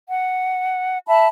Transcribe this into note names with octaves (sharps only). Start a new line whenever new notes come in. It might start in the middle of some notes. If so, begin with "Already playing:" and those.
F#5
E5 A5 B5